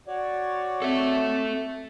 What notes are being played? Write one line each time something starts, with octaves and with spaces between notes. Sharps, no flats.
F#4 C#5 D5
C4 A4 E5